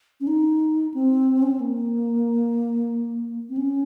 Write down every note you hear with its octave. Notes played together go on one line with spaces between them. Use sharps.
C#4
D#4
C4
C#4
C4
A#3
C4
C#4